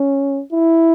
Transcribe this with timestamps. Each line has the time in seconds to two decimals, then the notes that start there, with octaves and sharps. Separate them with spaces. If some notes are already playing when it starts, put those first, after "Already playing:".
Already playing: C#4
0.53 E4